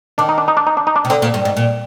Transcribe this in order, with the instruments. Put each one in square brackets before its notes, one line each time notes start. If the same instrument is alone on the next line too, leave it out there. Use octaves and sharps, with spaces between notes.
[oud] D#3 [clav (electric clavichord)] D4
[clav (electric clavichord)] D#4
D4
D#4
D4
D#4
D4
D#4
D4
[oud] C3
[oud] D3 [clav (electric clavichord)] C4
[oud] A#2
G2
G#2
A#2